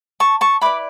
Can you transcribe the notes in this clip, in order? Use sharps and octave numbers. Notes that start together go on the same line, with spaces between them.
A5 C#6
A5 C#6
E4 B4 D5 B5 D6